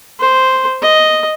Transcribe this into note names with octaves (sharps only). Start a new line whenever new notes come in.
C5
D#5